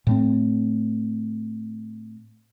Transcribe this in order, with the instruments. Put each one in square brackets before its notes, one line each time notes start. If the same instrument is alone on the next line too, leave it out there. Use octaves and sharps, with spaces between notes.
[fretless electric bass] A2 A3 C4